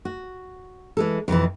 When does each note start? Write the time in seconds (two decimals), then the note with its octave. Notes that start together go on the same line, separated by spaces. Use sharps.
0.05 F#4
0.97 E3 G#3 A4
1.28 F2 B2 D3 E3